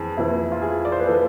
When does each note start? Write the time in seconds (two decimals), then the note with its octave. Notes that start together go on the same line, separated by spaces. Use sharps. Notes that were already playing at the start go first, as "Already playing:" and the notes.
Already playing: F2 E3 G#4
0.17 F2 E3 E4
0.52 F4
0.62 G#4
0.85 D5
0.92 C5
1.00 B4
1.07 E3 A4